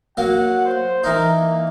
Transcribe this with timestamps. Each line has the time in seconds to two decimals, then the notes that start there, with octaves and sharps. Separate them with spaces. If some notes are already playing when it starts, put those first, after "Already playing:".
0.17 F#3 A#3 F#5
0.66 C5
1.04 E3 D#4 A#4
1.38 A#3